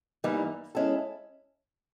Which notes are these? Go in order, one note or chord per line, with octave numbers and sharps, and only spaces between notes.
G2 E3 G3 A#3 D#4
G#3 C#4 E4 A4